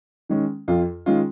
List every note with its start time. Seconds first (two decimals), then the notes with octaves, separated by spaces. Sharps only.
0.29 D#3 G#3 C#4
0.68 F2 F4
1.06 D#3 G#3 C#4 F4